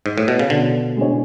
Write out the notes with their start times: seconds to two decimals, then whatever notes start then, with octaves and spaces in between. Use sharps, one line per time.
0.06 G#2
0.18 A2
0.28 B2
0.39 C#3
0.50 B2 D3
0.97 G#3 D4 G#4 C#5